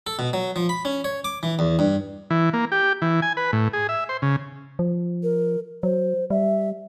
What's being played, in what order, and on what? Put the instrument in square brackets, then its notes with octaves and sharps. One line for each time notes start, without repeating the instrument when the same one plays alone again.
[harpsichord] A4
B2
F#3
F3
B5
C#4
C#5
D6
E3
E2
G2
[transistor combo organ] E3
A#3
G4
E3
G#5
B4
A2
G#4
E5
C5
C#3
[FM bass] F3
[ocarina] A#4
[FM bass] F#3 [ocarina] C5
[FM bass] G3 [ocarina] E5